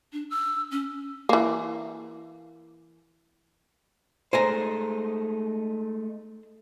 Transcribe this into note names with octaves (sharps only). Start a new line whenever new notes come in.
D4
E6
C#4
E3 A#3
G#3 A3 D#4 C5 G#5 A#5